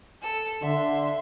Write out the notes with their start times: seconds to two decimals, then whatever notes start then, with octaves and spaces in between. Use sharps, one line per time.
0.22 A4 E6
0.63 D3 E5 C6